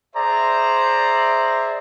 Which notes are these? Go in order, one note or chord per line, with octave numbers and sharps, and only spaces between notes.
G#4 C5 D5 E5 A#5